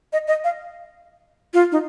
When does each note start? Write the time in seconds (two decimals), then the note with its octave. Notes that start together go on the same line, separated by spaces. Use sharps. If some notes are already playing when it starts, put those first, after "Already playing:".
0.13 D#5
0.27 D#5
0.44 F5
1.54 F4
1.72 D#4